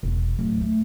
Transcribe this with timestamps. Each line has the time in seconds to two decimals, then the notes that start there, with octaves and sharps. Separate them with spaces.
0.03 E1
0.39 D1
0.61 A3